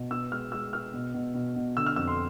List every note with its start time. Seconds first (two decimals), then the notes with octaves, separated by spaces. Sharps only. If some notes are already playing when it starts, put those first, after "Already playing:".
Already playing: B2
0.11 B3 E6
0.31 G#3 F6
0.52 G#3 E6
0.73 B3 F6
0.93 B2
1.14 B2
1.35 B2
1.56 B2
1.77 D3 E6
1.87 F6
1.96 F2 E6
2.08 C6